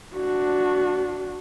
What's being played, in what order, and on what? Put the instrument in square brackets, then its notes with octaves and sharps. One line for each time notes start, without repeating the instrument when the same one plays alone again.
[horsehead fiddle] D4 F#4